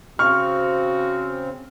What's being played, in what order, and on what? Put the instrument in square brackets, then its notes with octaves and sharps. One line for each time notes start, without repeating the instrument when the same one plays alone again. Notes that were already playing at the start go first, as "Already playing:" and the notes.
[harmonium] C#3 C4 [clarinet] F#4 [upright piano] C#6 F6